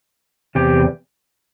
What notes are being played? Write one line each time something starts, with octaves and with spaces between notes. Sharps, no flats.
E2 C3 G4